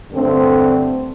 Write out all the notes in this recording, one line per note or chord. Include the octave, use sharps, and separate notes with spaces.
G2 D3 A3 C4